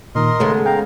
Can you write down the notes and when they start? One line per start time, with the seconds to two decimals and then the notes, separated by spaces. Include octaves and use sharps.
0.15 A#2 D#3 A#4 D#5 C6
0.40 C#3 G#3 A3 B3 A4
0.66 F5 G5 A#5